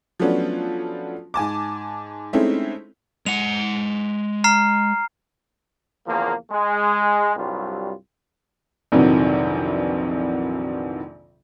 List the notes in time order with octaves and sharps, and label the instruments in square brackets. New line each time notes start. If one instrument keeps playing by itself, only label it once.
[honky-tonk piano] F3 F#3 A3 B3 C#4 D4
G#2 G#5 A5 D6
G#3 A3 C4 C#4 D#4 E4
[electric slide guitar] G#3 F#5 [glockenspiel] F7
[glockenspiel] A#5 F6 C7
[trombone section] E2 C#3 F3 A#3
G#3
C2 G2 F#3 G3 F4
[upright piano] A#1 F2 C3 D#3 E3 F#3